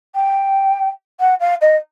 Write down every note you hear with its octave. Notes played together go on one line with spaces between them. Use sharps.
G5
F#5
F5
D#5